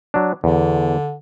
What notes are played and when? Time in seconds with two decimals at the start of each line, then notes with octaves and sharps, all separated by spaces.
0.14 F#3 D4
0.44 E2 D3